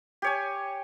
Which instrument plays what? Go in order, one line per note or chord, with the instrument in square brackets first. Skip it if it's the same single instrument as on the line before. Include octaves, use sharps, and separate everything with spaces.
[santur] G4 C#5 G#5